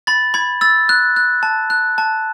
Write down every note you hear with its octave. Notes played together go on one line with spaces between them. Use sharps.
B5 A6
B5 G#6
E6 A6
F#6
F#6
A5
F#6
A5